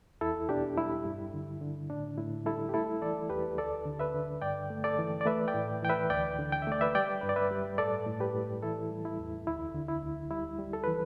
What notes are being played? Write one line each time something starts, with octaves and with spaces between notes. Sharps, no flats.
E2 E4 A4
B2 D4 G4
G3 E4
G2
D3
D3
A2 D4
A2 E4
G3 E4 A4
G4
A3 E4 A4
E3 A4 D5
E2 G4 B4
D2 A4 D5
D3
B4 E5
D3
G2 D5 G5
A3
A4 D5
E3
D5
A3 B4 E5
D5 G5
A2
E3 G5
B4 E5
D2 D5 G5
D3
G5
E5
A3 D5
B4 E5
G3 D5 G5
G2 B4
D5
B4 E5
G3
A2 A4 D5
A2
G4 B4
A2
E3 E4 A4
G3
E4
E2
D2 E4
D3
E4
D2
G3 E4
G3
A4
E3 B4